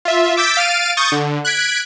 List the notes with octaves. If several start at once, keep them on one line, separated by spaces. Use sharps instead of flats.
F4 E5
D6 E6 G6 A6 B6 D7
F5 F6 A6 D7 D#7
C#6 D#6 G6 A6
D3
F#6 G#6 B6 D7